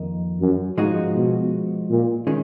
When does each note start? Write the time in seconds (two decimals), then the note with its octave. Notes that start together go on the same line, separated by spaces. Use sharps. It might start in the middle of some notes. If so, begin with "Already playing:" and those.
Already playing: F2 D#3 A#3 D#4
0.41 F#2
0.78 G#2 F3 G#3 D#4 F#4
1.15 B2
1.90 A#2
2.27 D#3 G#3 C#4